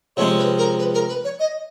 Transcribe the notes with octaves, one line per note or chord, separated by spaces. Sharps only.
C3 F3 G#3 C#4 C#5
B4
A#4
B4
A#4
B4
C#5
D#5